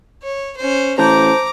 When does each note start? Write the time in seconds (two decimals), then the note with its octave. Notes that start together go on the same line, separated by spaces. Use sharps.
0.23 C#5
0.56 C#4 C5
0.98 A1 C5 A5 A#5 D6 G6